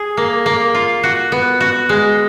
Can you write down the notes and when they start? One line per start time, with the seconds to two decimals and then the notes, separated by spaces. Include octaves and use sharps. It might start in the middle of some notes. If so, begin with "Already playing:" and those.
Already playing: G#4
0.17 A#3
0.46 A#3
0.75 F4
1.03 F#4
1.32 B3
1.60 F#4
1.89 G#3